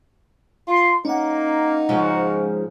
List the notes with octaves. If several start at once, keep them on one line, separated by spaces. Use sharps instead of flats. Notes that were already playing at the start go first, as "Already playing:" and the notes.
F4 C6
A#3 C#4 D#4 F#5
G#2 C#3 F3 F#4